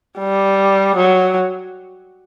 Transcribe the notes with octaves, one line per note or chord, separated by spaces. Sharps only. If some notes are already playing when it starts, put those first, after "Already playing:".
G3
F#3